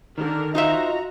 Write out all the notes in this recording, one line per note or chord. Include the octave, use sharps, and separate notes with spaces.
D3 D#3 A#4
D#4 F4 F#4 C5 D#5 E5 A#5